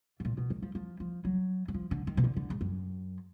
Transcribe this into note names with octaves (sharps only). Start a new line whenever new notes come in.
G#2
A#2
B2
D#3
F3
F3
F3
F#3
F#3
F3
D3
D#3
B2
D3
D3
G#2
F#2